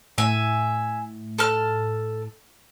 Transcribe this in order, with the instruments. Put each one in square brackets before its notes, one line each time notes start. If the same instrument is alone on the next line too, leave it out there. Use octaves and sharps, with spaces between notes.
[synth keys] A2 [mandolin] E5 G#5
[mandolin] A4 A5 F6